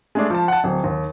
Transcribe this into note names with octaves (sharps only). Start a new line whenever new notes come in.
G#3 A3 D4
F3 A5
F#5 A5
D1
D#2